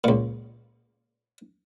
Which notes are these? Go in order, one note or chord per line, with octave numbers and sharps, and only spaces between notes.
C#2 A#2